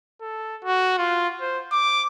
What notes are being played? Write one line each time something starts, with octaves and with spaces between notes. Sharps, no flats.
A4
F#4
F4
C5
D6